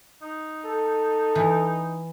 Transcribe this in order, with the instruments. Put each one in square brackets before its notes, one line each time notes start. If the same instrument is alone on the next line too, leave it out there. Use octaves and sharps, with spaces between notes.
[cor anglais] D#4
[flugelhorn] A4
[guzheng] E3